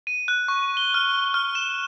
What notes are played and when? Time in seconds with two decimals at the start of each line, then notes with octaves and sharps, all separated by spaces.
0.07 D#7
0.28 F#6
0.48 C#6
0.77 G7
0.94 F6
1.34 F6
1.55 E7